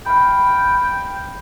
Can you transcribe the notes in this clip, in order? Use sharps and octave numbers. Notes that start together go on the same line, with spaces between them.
F5 G5 B5